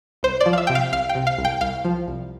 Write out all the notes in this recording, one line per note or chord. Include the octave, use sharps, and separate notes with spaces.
C2 C5
D5
F3
F5
E5
C3 G5
F5
C2 F5
G5
C3
F5
C2
G5
C2 F5
F3
C2